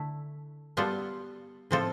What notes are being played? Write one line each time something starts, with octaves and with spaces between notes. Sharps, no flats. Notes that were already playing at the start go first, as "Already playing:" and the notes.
Already playing: D3 A3 E4 A4
G3 B3 F4 A4
A2 F3 C4 F4 A4